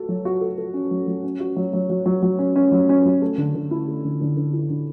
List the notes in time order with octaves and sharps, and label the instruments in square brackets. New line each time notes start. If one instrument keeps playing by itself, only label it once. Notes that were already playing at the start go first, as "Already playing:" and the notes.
Already playing: [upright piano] F#4 A4
F#3
F#4
A4
A4
C#4
F#3
F#3
C#4
F#4
F#3
F#3
F#3
F#3
F#3
C#4
C#4
F#3
C#4
F#3
A3
D3
D3
E4
A3
D3
D3
D3
E4
D3